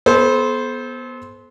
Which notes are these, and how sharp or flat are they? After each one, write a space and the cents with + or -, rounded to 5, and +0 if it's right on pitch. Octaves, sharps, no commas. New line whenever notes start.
B3 -15 A4 -35 C5 +0